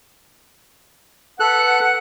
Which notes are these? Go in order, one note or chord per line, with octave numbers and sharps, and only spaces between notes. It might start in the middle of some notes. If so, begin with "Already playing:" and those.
A4 B4 F#5 F#6